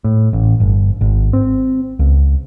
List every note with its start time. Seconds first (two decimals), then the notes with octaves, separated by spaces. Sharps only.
0.04 A2
0.33 A1
0.60 G1
1.01 G#1
1.33 C4
1.99 C#2